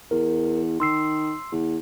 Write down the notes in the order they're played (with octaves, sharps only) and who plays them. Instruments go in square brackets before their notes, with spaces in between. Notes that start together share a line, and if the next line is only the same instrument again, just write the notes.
[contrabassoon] E2 [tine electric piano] A#4
[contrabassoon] D#3 [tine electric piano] C6 E6 C7
[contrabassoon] E2